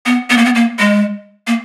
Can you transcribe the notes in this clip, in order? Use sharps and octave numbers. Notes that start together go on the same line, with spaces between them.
B3
B3
A#3
B3
A#3
G#3
A#3